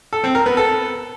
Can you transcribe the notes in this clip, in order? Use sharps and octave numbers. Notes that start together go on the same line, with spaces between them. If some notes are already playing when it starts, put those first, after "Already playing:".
A4
C4
A#4
B3
A4